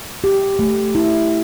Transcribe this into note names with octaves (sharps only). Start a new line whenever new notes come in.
G4
A3
E4